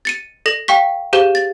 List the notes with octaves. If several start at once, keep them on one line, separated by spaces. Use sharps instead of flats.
A6 C#7 D#7
A4 A#6 F#7
F5 G5 C#6 B6
G4 G#4 C5 F5 G6 G7
A6